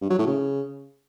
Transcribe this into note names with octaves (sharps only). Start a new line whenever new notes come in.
G2
F#3
A2
C#3